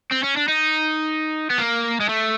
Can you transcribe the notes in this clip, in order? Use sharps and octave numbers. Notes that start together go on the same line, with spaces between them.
C4
C#4
D4
D#4
B3
A#3
G#3
A3